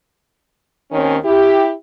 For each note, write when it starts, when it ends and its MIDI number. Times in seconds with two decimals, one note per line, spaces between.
0.92 1.16 39
0.92 1.16 51
0.92 1.16 60
0.92 1.16 61
1.24 1.71 64
1.24 1.71 67